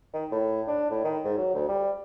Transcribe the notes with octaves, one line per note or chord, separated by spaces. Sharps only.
D#3
A2
D4
A2
D#3
G#2
F#3
D2
G3